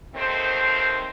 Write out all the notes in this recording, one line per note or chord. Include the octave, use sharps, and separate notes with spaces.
D#2 D#3 A3 C4 C5